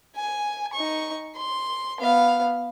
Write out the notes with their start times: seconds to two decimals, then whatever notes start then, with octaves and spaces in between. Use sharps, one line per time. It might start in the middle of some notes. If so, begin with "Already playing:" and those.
0.16 G#5
0.73 D#4 C#6
1.37 C6
2.00 B3 F5